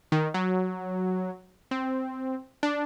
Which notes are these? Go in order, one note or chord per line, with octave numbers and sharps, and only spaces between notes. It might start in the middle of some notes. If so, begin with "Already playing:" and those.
D#3
F#3
C4
D4